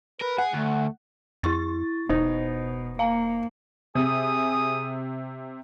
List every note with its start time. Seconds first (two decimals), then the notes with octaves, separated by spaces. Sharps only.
0.21 A#4 B4
0.38 G#4 F#5
0.53 D2 A3
1.43 F2 E4 C#6 A6
2.09 E1 B2 D#4 C5
2.99 A#3 F5 A#5
3.95 C3 G#4 G#5 D#6